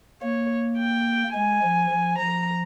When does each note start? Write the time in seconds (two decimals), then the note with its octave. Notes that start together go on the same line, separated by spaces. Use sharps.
0.22 A#3 C#5
0.78 G5
1.34 G#3 G#5
1.63 F3
1.90 F3
2.19 F3 A#5